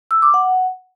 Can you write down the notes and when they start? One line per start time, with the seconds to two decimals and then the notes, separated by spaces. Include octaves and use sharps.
0.11 E6
0.22 D6
0.34 F#5